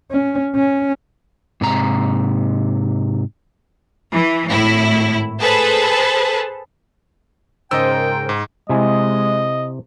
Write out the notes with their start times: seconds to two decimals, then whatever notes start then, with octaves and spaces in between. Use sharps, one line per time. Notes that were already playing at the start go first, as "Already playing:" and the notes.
0.11 C#4
0.55 C#4
1.61 G#2 C3 A#5
4.13 E3
4.50 G#1 A2 E4
5.41 G#4 A4 B4 C5 A5
7.71 G#2 C#3 A#4 C5 D#5 G5 E6
8.29 G#2
8.69 C3 G#3 E4 D#5 G#5